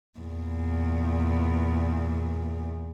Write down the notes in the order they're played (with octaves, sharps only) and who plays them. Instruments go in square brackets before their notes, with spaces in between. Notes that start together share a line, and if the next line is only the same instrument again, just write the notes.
[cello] E2 A#2